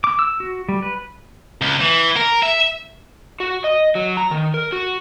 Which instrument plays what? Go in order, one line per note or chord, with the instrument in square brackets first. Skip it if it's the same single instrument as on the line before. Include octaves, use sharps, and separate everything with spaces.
[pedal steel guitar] D6
E6
F#4
G3
B4
[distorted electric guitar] C#2
E3
A#4
E5
[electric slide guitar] F#4
D#5
F#3
A#5
D#3
A#4
F#4